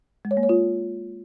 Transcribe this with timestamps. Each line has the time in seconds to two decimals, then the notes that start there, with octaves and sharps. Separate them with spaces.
0.25 G#3
0.31 C#5
0.37 A#3
0.43 C#5
0.49 F4